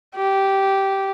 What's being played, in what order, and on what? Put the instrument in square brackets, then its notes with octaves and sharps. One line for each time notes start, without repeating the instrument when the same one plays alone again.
[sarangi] G4